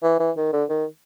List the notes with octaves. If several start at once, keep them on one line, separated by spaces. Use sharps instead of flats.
E3
E3
D#3
D3
D#3